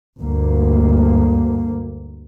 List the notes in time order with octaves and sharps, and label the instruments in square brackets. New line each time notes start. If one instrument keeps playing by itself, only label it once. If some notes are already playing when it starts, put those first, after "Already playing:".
[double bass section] D2 G2 A#3